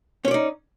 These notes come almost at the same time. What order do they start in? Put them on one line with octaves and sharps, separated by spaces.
C#4 C#5 D5 D#4